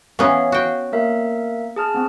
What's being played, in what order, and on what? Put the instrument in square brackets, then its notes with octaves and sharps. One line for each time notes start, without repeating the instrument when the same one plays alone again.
[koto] E3 B3 C#4 [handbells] F5
[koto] F#4 G5
[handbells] A#3 A#4 E5
G#4 A5 F6
B3 C4